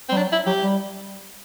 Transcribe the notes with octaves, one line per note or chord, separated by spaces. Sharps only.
C4
G3
F#3 D4
E4
F#3 G4
G3